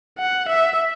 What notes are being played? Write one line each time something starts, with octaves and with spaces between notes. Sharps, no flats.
F#5
E5